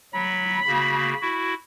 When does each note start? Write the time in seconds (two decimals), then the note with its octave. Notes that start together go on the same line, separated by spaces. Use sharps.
0.14 F#3 B5
0.67 C#3 A#3 F#4
1.21 E4 F#4